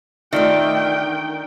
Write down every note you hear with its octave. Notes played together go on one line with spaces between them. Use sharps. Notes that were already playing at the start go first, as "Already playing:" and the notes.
D#3 A3 D4 F4 A#4 D5 E5 G5